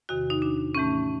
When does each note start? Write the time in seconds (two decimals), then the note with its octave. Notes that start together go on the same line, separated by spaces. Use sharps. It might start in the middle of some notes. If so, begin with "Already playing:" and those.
0.09 E2 C3 D#3 F#4
0.30 D#4
0.42 D4
0.75 A2 E3 A3 C#4